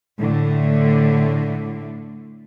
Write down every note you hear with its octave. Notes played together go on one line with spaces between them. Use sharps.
A2 D3 A3